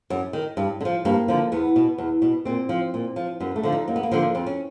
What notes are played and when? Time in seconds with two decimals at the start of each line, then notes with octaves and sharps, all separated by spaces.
0.10 F#2
0.33 D#3
0.57 G2
0.81 D3
0.85 F3
1.05 G2 A#3
1.28 D3 F3
1.52 E2 B3
1.76 B2
1.98 E2
2.22 B2
2.45 A#2 C4
2.69 F3
2.94 A#2
3.16 F3
3.40 F#2 B3
3.56 A3
3.63 D3 F3
3.72 D#4
3.88 F#2 A#3
3.96 B3
4.03 A#3
4.12 D3 F3
4.35 F2 C4
4.46 C#4